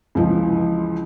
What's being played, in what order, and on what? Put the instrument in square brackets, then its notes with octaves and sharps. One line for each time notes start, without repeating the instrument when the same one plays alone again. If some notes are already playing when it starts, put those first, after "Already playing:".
[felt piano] C#2 E3 F3